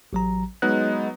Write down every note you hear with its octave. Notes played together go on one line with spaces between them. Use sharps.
A1 F#3 A#5
F#3 G#3 B3 D#4 F#6